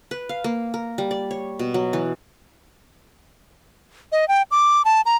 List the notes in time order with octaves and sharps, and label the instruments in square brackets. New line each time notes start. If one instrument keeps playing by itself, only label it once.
[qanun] B4
F5
A#3
A#4
G3
D5
C#5
B2
F#3
E3
[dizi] D#5
G5
D6
A5
A#5